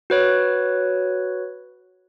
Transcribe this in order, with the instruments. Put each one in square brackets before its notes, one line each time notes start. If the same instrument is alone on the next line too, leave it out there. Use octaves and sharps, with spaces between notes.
[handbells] F#4 B4 C#5